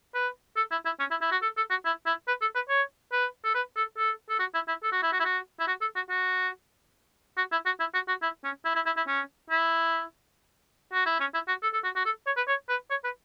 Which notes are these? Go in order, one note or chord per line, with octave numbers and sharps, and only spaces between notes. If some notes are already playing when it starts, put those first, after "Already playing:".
B4
A4
E4
E4
C#4
E4
E4
F#4
A4
A4
F#4
E4
E4
B4
A4
B4
C#5
B4
A4
B4
A4
A4
A4
F#4
E4
E4
A4
F#4
E4
F#4
E4
F#4
E4
F#4
A4
F#4
F#4
F#4
E4
F#4
E4
F#4
F#4
E4
C#4
E4
E4
E4
E4
C#4
E4
F#4
E4
C#4
E4
F#4
A4
A4
F#4
F#4
A4
C#5
B4
C#5
B4
C#5
B4